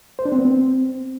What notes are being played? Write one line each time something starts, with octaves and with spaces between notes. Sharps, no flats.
C5
D4
C4
B3
C4